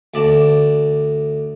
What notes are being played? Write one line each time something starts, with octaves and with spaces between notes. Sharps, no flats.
D2 D5 A5